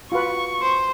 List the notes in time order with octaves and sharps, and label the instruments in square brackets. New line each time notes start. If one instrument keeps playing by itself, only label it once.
[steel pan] F4 F#4 B4 [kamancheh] C#6
[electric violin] C5 C6